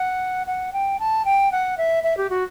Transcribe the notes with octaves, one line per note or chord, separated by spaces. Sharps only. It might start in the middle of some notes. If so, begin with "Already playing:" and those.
Already playing: F#5
F#5
G5
A5
G5
F#5
E5
E5
G4
F#4